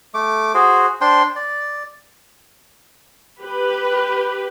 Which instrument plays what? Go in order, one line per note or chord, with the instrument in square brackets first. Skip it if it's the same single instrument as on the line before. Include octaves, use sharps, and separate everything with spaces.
[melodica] A3 D6
F#4 G#4 C5
D4 C5 G5 C6
D5
[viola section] G4 B4